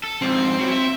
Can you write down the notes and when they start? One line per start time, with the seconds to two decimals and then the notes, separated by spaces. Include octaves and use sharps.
0.04 A4
0.22 F2 G#2 C4
0.60 F#3 E4
0.72 E5